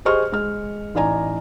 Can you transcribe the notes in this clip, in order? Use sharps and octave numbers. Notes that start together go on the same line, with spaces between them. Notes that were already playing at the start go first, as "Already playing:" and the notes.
G4 G#4 C5 D#5 C#6 F6
G#3 F6
A1 D#4 D5 G#5 A#5